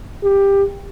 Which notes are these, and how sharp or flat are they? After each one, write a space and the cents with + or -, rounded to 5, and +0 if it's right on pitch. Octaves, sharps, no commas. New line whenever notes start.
G4 +15